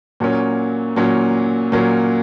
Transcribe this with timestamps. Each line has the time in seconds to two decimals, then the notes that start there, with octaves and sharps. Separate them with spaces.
0.20 A#2 F#3 A#3 C#4
0.96 A#2 F#3 A#3 C#4
1.72 A#2 F#3 A#3 C#4